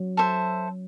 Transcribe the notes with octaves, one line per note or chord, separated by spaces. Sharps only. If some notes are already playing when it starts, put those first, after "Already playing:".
Already playing: F#3
A4 C5 E5